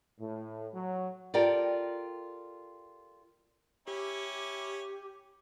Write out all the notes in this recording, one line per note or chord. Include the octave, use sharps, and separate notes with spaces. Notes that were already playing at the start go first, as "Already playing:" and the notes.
A2
F#3
F4 G4 A4 A#4 D5 G5
C#4 E4 G4 C#5